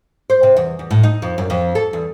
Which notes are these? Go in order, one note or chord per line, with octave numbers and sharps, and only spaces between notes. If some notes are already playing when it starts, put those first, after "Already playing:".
C5
C3
E2
E2
A2
D#4
F2
F#2
F2
A4
E2